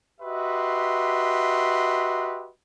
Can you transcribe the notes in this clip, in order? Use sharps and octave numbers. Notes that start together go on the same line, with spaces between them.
F#4 G4 B4 D#5 E5 C6